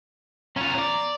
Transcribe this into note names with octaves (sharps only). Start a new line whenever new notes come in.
E2 C#4 F4 A#5
D5